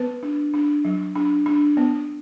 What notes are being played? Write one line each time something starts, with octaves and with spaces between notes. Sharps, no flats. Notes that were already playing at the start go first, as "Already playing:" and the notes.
Already playing: B3 B4
D4
D4
F#3
D4
D4
B3